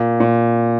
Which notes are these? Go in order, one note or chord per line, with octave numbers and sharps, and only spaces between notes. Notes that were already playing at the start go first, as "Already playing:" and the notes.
Already playing: A#2
A#2